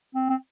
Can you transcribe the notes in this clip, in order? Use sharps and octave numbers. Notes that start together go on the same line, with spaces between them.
C4
C4